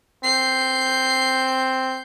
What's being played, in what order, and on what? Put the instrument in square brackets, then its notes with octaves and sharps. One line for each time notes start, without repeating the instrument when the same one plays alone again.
[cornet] C4 [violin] G6 C7